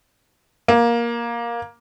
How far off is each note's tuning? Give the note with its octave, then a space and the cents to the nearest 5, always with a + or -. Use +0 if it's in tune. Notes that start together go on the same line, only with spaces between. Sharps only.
A#3 +15